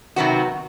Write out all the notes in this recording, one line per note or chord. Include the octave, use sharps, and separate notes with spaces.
C3 D#3 F#3 B3 F#4